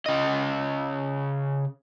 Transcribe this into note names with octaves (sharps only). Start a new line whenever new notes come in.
C#3 D#5